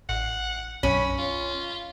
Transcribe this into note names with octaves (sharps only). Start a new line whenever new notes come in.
A1 F#5
B1 F#2 C#4 B5
F4